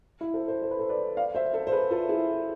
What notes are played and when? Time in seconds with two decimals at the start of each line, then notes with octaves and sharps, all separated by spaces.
0.21 E4
0.34 A4 C5
0.48 A4 C5
0.62 C5
0.71 B4
0.79 A4 C5
0.89 B4 D5
1.17 D5 F5
1.35 C5 E5
1.53 A4 C5
1.67 C5
1.72 G#4 B4
1.91 F4 A4
2.09 E4 G#4